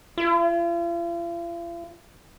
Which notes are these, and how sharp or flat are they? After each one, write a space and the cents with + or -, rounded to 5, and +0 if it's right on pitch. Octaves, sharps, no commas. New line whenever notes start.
F4 -45